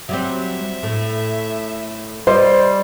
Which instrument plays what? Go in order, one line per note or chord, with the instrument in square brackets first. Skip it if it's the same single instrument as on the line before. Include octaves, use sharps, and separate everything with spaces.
[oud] F#3 G3 C4 [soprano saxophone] E5
[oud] A2
[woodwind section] G3 [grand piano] C5 [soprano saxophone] D5 [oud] D#5